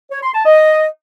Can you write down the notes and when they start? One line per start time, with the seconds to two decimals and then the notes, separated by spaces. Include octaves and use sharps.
0.11 C#5
0.23 C6
0.34 A5
0.46 D#5